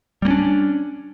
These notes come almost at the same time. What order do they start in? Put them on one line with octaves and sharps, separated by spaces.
G3 A#3 C#4 D4